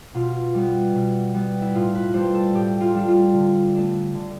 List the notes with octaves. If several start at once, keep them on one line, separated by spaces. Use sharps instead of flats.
B2 F4
G3 B3
B2
G3 B3
E4
A2 F4
B4
G3 D4 C5
A4
A2 G4
F4
G3 D4
F4
D3
A3 D4
D3